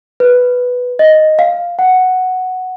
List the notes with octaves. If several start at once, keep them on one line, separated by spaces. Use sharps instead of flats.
B4
D#5
F5
F#5